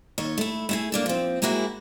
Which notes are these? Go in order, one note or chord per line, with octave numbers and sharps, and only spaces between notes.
D#2 C#5 D#5
A3 E4
A3 E4 G#4
A#3 D4 A4
F3 C4
G#3 A#3 C4 E4 F#4 G#4